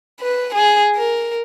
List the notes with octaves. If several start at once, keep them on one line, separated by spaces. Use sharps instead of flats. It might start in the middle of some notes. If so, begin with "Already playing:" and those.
B4
G#4
A#4